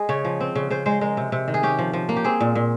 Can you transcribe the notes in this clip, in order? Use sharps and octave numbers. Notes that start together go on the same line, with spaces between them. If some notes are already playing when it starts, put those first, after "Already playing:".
Already playing: G#3 G#4
C#3 C#5
F3
C4
C#3
C#3 C5
G#3 C5
G#3 A#4
C3
C3
D#3
G#4
C#4 G4
F3
F3
A#3
G4
C4 G#4
A#2
A#2